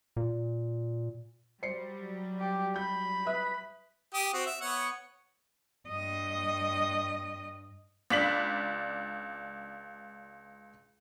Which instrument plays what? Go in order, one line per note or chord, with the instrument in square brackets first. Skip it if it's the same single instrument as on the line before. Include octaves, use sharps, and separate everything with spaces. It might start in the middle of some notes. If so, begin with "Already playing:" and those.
[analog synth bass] A#2
[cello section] F#3 G3 [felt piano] C5 C7 C#7
[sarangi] G4
[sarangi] B5 [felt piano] G6
[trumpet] B4 [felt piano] E5 D#6
[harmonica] G4 D#6
C4 F#4
E5
B3 C#5 F#5
[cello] G2 D#5
[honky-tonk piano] C#2 D4 B6 F#7